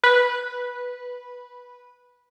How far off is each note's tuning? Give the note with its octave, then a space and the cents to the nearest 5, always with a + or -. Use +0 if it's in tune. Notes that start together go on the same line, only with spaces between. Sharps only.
B4 -10